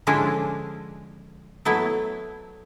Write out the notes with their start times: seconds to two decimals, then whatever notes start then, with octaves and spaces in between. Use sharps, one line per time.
0.07 D3 F3 G#3 C#4 D4 E4
1.65 F#3 A3 B3 E4